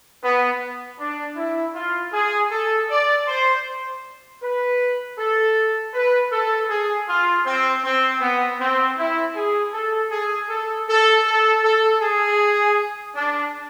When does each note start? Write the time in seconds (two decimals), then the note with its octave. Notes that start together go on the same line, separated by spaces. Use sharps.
0.23 B3
0.99 D4
1.36 E4
1.74 F4
2.12 G#4
2.51 A4
2.89 D5
3.27 C5
4.41 B4
5.17 A4
5.93 B4
6.31 A4
6.69 G#4
7.07 F4
7.45 C4
7.84 C4
8.21 B3
8.59 C4
8.98 E4
9.35 G#4
9.72 A4
10.11 G#4
10.49 A4
10.88 A4
11.25 A4
11.63 A4
12.01 G#4
13.15 D4